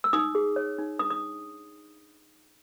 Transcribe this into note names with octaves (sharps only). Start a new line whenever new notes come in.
E6
D#4 D#6
G#4
C#5
D#4
D4 D#6
D#6